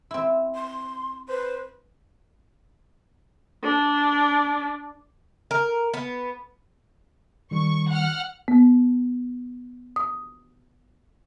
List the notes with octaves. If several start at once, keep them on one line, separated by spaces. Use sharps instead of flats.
C4 E4
C6
B4 C5
D4
A#4
B3
D#3 G3 C#6
F#5 F6
B3
D#6